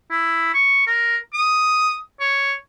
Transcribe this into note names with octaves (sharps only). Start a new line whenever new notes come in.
E4
C#6
A#4
D#6
C#5